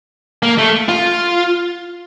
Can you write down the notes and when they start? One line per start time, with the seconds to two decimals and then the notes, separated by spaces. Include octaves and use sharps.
0.43 A#3
0.58 A3
0.89 F4